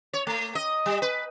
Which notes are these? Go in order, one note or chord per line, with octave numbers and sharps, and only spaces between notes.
C#5
A3
D#5
G3
B4